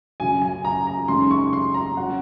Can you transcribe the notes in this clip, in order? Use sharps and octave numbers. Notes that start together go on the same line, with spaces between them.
F#2 C#3 F#3 G#5
G#5
A#5
A#5
F#2 C#3 G#3 D#4 C6
C#6
C6
A#5
F#3 C#4 F#5